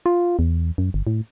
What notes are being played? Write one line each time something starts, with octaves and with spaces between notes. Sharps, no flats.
F4
E2
F#2
G1
A2